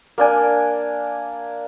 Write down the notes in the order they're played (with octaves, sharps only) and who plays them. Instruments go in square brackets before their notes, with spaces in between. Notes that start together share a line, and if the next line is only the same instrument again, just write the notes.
[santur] A#3 D4 G#5